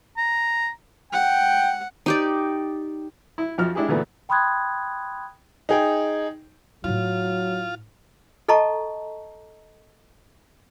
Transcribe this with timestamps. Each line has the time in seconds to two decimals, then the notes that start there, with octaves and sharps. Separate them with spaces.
0.17 A#5
1.13 F#5 G5
2.06 D#4 G4 D5
3.38 E4
3.58 F2 F3 F#4 F6
3.75 G#3 D4 E4 G4 G#4
3.88 D2 A#2 E3 A3 B3
4.29 G5 B5 C6 D#6 F#6 G#6
5.69 D#4 G#4 G5
6.84 A2 F#3 E4 F4
8.49 A4 D#5 A5 A#5 C#6